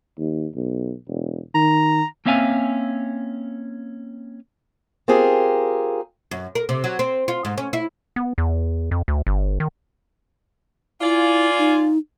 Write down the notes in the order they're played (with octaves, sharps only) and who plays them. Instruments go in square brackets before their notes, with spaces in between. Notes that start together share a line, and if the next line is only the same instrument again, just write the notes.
[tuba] D#2
B1
E1
[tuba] D#3 [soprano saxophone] A#5
[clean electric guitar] A#3 C4 C#4 E5 F5 G#5
[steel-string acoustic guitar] C4 F4 G4 G#4 A#4
[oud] F#2
A#4
C3
F#3
C4
F4
G#2
C#4
E4
[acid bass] B3
E2
F2
D2
G1
D#3
[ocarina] E4 [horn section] F4 D5 G#5
[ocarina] D#4